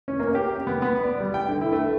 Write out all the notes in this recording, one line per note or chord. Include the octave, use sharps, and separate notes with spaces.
C#4
A#3
G4
B3
B3
D5
G3
G5
D3
E4
A3